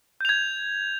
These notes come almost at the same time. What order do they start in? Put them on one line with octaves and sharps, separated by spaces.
G6 F7 G#6